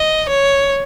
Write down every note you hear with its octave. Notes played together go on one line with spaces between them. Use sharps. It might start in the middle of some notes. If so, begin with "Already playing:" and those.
Already playing: D#5
C#5